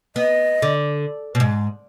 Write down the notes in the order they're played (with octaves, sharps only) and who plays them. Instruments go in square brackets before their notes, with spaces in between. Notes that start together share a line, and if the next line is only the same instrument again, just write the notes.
[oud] B3 [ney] D#5
[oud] D3
B2
G#2